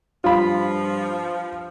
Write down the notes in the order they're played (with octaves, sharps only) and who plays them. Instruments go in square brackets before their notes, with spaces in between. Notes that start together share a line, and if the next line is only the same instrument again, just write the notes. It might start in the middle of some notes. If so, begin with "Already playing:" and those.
[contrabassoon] G2 [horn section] F3 [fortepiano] F4 B5